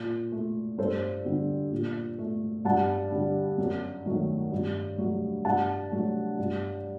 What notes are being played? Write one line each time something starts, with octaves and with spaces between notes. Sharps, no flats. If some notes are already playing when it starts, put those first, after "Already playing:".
Already playing: A#2
A3
G2 A4 C5
D3 G3
A#2
A3
G2 F#5 A5
D3 G3
F#2
D#3 F#3 A3
G2
F#3 A3
G2 F#5 A5
F#3 A3
G2